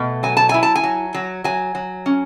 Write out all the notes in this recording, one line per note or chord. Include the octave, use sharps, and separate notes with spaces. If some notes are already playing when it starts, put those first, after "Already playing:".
Already playing: B2 A3
F#3 G#5
A5
E4 G#5
A5
G#5
F#3
F#3
F#3 G#5
F#3
C#4